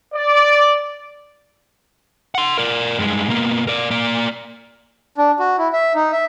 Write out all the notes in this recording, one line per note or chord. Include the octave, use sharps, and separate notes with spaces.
D5
F#5 C6
A#4 D5
G2 G#3
B2 A#3
A#4 D5
A#3 D5
D4
F#4
E4
E5
D#4
E5